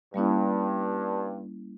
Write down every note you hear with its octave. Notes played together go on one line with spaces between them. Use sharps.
G2 G3 A#3 C#4 E4